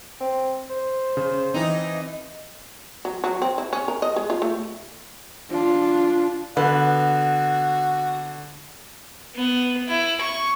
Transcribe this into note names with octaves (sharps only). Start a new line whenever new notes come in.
C4
C5
C#3
E3 C4 D#4
F#3
F#3
C4
E4
C#4
A#4
D#5
G#3
F4
A3
D4 F4
D3 B3 F#4
B3
E4
C#6